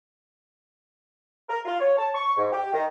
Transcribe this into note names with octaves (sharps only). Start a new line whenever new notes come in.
A#4
F4
C#5
A5
C#6
G#2
G4
D#3